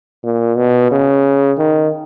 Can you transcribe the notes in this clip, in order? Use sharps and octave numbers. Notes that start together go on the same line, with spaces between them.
A#2
B2
C#3
D#3